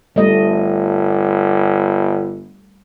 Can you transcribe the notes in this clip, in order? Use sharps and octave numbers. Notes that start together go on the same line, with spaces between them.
G1 G3 A3 D#5